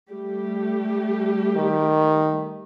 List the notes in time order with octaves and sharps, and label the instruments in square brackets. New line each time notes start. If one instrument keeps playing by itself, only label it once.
[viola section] G3 A3 G4
[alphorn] D#3